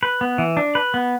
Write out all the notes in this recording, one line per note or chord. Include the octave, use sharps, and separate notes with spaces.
B4
B3
E3
D4
B4
B3